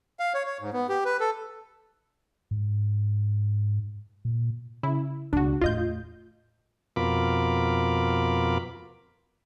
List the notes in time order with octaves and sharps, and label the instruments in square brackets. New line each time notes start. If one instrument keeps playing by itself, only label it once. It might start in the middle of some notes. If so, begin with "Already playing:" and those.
[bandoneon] F5
C#5
C#5
G#2
B3
G4
B4
A4
[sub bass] G#2
A#2
[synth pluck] C#3 E4
[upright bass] C#2 B2 [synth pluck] D4 F#4
[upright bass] E2 A2 [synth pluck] F4 D#5 G6
[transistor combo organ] F2 B2 F4 A#4 B5 D6